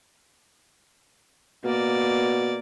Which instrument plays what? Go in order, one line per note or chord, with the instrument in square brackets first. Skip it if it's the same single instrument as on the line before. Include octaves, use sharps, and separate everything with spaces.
[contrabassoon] B2 [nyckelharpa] A#3 D5